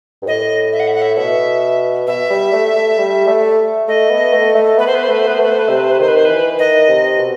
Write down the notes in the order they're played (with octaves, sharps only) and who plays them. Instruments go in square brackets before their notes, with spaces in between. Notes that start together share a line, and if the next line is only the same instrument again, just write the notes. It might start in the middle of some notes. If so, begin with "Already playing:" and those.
[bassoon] G2
[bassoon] A2 [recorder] D#5
[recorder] E5
F#5
E5
F#5
E5
[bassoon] B2 [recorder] E5
[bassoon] B2 [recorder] E5
[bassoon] G3
A3
A3
G3
A3
[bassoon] A3 [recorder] D#5
[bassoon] B3
A3
A3
[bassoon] B3 [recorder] B4
[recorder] C5
[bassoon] B3 [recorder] B4
[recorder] C5
[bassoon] A3 [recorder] B4
[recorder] C5
[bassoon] B3 [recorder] B4
[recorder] C5
[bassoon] A3 [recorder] B4
[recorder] C5
B4
[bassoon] C3 [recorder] C5
[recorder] B4
C5
B4
[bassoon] D#3 [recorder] C5
[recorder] B4
C5
[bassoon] E3 [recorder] B4
[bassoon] D#3 [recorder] D#5
[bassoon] C3
B2